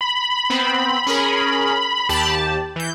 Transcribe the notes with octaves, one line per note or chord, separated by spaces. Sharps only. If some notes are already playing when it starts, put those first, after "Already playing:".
B5
B3 C4 C5
C#4 G#4 A#4
D#2 G4 A5
E3 G6